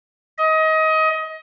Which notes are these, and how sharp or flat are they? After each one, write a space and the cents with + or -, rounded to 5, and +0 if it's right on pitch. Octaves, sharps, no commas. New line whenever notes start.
D#5 +25